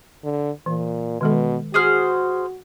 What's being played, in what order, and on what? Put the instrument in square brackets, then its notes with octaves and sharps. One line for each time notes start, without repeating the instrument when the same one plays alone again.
[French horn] D3
[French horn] A#2 [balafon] E3
[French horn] B2 [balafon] D#3 G#3 A4
[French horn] F#4 [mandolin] G#4 C5 F6